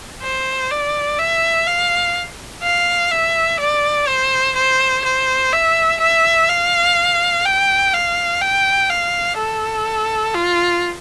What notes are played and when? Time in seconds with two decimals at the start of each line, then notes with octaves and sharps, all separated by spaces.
0.22 C5
0.71 D5
1.19 E5
1.67 F5
2.63 F5
3.11 E5
3.60 D5
4.08 C5
4.56 C5
5.04 C5
5.53 E5
6.01 E5
6.49 F5
7.46 G5
7.94 F5
8.41 G5
8.90 F5
9.38 A4
10.35 F4